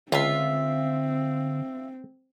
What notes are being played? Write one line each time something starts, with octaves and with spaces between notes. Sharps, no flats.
C#2 D3 C4 F4 E5